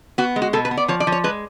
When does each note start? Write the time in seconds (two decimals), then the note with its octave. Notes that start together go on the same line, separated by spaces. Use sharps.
0.18 B3 F#4
0.36 G#3
0.42 F#4
0.53 B2 A4
0.65 B4
0.71 B3
0.77 D5
0.88 F3 C#5
1.00 D5
1.07 F3
1.12 C#5
1.24 G#3 B4